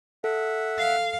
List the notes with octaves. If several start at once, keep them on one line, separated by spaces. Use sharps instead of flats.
A4 E5 F#5
F5